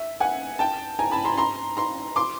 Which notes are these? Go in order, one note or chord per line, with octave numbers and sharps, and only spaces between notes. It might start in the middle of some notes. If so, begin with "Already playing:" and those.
Already playing: E5
F#5 G#5
G5 A5
G#5 A#5
A5 B5
A#5 C6
A#5 C6
A#5 C6
C6 D6